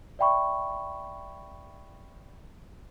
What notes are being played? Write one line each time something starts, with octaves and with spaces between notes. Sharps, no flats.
D5 E5 G5 B5 C#6